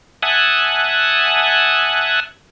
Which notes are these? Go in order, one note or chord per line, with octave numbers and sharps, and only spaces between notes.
E5 F#5 G#5 A5 D#6 F#6